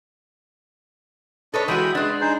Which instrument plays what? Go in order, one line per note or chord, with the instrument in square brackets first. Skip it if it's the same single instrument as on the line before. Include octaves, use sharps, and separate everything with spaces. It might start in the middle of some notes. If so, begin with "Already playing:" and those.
[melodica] D4 D#5 [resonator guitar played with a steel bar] A4 B4 C#5
[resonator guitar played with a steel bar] E3 G#3 F#4 [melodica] G5 B5 D#6
[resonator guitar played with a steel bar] G#3 D4 [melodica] B4
[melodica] D#4 G#4 C5